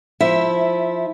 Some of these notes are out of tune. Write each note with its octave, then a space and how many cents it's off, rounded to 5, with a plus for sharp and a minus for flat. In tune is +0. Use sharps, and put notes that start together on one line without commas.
F3 +0 E4 -10 E5 +0